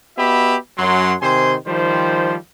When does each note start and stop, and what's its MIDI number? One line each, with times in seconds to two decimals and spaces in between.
0.17 0.56 59
0.17 0.56 66
0.17 0.56 67
0.17 0.56 75
0.17 0.56 76
0.17 0.56 83
0.78 1.14 42
0.78 1.14 54
0.78 1.14 84
1.21 1.55 48
1.21 1.55 51
1.21 1.55 72
1.21 1.55 80
1.21 1.55 84
1.67 2.36 51
1.67 2.36 53
1.67 2.36 55
1.67 2.36 72